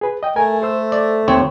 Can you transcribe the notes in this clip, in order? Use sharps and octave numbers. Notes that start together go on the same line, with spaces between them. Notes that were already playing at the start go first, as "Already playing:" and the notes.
G#4 B4
D#5 G5
A3 A#4 G#5
A4 C5 E6
D5
D#2 C4 C#5